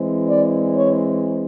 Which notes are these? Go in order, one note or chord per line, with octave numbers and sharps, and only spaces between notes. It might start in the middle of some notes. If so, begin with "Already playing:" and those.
Already playing: E3 G#3 C4
D5
C#5